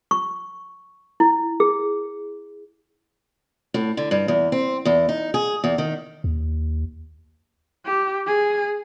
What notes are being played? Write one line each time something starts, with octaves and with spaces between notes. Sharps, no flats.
C#6
E4
G#4
A2
D3
G2
E2
C4
E2
D#4
G#4
E2
D#3
D#2
G4
G#4